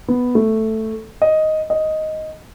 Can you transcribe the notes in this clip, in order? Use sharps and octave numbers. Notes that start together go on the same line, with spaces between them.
B3
A3
D#5
D#5